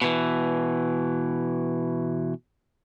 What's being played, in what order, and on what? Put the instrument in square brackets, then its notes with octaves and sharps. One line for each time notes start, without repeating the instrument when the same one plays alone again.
[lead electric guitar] B2 E3